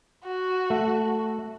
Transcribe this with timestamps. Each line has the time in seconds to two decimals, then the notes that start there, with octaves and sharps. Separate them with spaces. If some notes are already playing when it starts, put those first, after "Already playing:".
0.24 F#4
0.70 A3